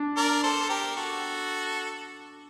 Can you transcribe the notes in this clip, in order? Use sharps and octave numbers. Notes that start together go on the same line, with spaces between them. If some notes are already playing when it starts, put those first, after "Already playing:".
Already playing: D4
A#4 D5
A4 C5
A4
G4 A#4
F#4 A4